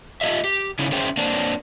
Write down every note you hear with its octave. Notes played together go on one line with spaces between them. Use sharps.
A3 F4 G4 D#5 E5
G4
C#3 C#4 D#4 E4
C#4 G#4 A#4 C5 E5 G5
A#3 C4 D4